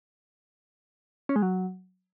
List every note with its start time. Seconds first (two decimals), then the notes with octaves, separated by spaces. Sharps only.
1.29 C#4
1.36 G#3
1.42 F#3